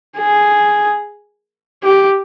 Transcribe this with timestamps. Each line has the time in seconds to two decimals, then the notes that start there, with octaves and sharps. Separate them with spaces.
0.18 G#4
1.83 G4